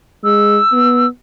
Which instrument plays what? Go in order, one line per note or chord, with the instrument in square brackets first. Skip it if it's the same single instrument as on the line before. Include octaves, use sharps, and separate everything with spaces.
[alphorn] G#3 [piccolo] E6
[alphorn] B3